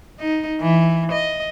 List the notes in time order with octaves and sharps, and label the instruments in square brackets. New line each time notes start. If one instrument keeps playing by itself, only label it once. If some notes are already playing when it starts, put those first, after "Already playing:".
[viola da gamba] D#4
E3
D#5